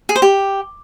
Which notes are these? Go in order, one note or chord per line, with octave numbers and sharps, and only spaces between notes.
G#4
C5
G4